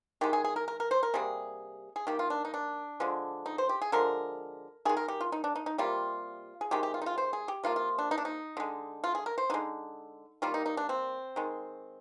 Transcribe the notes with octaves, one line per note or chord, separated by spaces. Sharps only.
D#3 G#3 G4
G#4
G#4
A#4
A#4
A#4
C5
A#4
C3 G3 A#3 G#4
G#4
D#3 A#3 G4
F4
D4
D#4
D4
D3 F3 G#3
D#4
C5
G4
G#4
D3 F3 G#3 A#4
D#3 G#3 G#4
A#4
G4
F4
D#4
D4
D#4
D#4
C3 G3 A#3 F4
G#4
C3 D#3 G#3 G4
G4
F4
D#4
F4
C5
G#4
G4
C3 F3 A#3 F4
F4
D4
D#4
D4
D#4
D3 G#3
F4
G#4
A#4
C5
D3 G#3 D#4
D#3 G3 A#3 F4
D#4
D#4
D4
C4
D#3 G#3